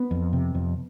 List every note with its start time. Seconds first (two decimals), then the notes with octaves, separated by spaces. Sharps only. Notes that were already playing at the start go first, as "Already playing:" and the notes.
Already playing: B3
0.11 F2
0.33 C3
0.55 F2